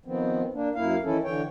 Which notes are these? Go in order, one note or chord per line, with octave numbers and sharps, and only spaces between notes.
D#3 F3 B3 C4
A#3 D4
F#2 A#3 E4 F5
D#3 E3 C#4 E4 A4
D3 E3 C#5 G5